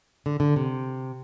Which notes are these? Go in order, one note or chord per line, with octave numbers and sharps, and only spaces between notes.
D3
D3
C3